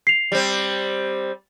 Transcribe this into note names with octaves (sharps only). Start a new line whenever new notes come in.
C7 F7
G3 C4